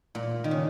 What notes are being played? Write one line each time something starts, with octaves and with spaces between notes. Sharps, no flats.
A#2
D#3
C#3